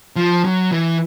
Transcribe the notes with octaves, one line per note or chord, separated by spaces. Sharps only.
F3
F#3
E3